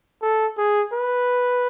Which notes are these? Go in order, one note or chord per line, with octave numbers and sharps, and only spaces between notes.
A4
G#4
B4